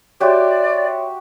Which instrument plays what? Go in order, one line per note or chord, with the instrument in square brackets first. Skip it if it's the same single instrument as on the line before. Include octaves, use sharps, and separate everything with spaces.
[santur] F#4 G4 [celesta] C#5 E5 C6 [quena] D5